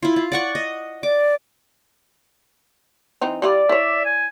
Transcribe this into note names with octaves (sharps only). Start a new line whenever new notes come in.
E4 F4
F4
D5 F#5 C#6
D#5
D5 D6
E3 C4 D#4
G3 E4 F4 D5
E4 C#5 E5
G#5